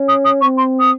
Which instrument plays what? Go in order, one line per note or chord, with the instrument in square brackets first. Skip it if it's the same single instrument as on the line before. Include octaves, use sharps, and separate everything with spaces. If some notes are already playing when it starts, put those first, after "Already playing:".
Already playing: [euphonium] C#4
[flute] D#6
D#6
[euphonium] C4 [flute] C#6
[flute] C6
D#6